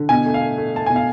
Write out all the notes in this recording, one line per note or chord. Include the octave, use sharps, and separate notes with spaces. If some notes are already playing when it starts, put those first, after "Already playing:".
Already playing: D3
B2 G#5
A3
F5
A3
A3
A3 A5
B2 G#5
F5